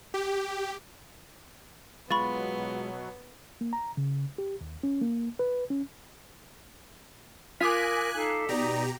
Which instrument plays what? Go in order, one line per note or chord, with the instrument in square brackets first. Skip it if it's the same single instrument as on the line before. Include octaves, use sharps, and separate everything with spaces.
[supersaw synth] G4
[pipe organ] B2 F#3 [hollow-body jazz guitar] G#3 F4 [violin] B3 [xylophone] B5 C#6 A6
[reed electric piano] A#3
A#5
C#3
G4
D#2
C#4
A#3
B4
C#4
[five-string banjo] F4 [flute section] A#4 [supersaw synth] G#5 F#6 [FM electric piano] D6 D#6 B6
[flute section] D#4 A4 F5
[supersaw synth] B2 G4 A#5 [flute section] D#4 D5